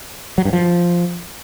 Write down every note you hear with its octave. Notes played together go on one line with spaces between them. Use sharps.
F#3
G2
F3